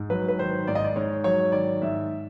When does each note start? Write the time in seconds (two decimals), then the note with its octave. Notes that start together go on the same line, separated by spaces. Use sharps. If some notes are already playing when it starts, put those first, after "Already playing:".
Already playing: G#2
0.10 F#3 B4
0.28 B4
0.39 D#3 C5
0.67 G#2 D5
0.75 D#5
0.85 D5
0.96 G#2 C#5
1.24 F#3 C#5
1.52 D#3 D5
1.82 G#2 E5